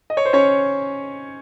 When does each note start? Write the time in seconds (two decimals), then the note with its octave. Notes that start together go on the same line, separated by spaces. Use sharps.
0.10 D#5
0.17 C#5
0.25 C5
0.33 C#4 C#5